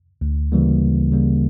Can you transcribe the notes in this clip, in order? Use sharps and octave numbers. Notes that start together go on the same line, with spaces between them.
D2
C#3 E3 G3 A#3
D2
C#3 E3 G3 A#3